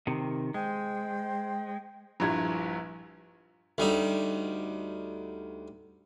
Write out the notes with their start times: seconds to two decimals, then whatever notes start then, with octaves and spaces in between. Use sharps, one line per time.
0.07 C3 D#3
0.54 G#3 C5 G5
2.20 A#1 G2 A#2 E4 A#5 G#6
3.78 D2 G3 D#4